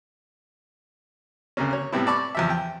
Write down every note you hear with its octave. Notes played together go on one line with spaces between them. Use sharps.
D2 C#3 A#3 C#4
C#5
A2 C3 G3 B3 C4 E4
D5 A5 B5 C#6 D6
E2 F3 E5
G5